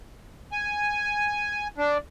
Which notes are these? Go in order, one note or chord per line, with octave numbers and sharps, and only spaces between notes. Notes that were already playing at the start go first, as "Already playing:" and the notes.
G#5
D4